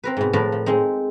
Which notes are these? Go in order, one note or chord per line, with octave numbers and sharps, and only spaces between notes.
C4 A#4 B4
G#2 B2
A2 F3 A#4 B4 A5
F3
G#3 C4 D#4